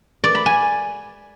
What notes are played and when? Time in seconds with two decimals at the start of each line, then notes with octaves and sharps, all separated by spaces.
0.24 D5
0.35 B5
0.46 G#5